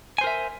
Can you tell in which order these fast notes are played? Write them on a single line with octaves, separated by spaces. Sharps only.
G#5 C5 A#4 E5